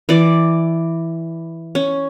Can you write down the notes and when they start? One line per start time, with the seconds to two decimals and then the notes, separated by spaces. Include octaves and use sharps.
0.09 E3 D5
1.75 C#4